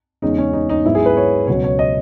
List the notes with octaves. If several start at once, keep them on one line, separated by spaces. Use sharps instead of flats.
E2 C#3 G#3 C#4 D#4
C#4
D#4
D#4
G#2 F#3 B3 E4
G#4
B4
C#5
C#2 B2 F#3 C#5
C#5
D#5